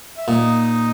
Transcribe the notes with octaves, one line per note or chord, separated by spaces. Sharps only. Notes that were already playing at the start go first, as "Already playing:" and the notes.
E5
A#2 D#4 D#5